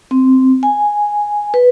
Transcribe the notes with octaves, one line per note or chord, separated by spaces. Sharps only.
C4
G#5
B4